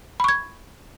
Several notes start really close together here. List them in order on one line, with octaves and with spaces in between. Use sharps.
B5 C#6 G#6